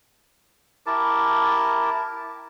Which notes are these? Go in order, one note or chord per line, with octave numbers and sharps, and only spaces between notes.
E4 G4 A#4 A5